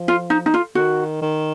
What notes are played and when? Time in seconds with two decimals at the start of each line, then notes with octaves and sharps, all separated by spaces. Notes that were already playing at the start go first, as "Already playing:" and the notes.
Already playing: F3
0.08 F4
0.30 D#4
0.46 D#4
0.54 F4
0.75 D#3 F#4
1.22 D#3